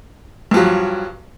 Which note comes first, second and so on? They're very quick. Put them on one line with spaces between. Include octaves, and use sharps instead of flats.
G2 F3 F#3